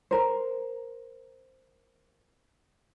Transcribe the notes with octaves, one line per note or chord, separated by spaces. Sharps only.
A#4 C5